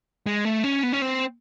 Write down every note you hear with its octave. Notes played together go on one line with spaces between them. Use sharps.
G#3
A3
C#4
B3
C#4
C4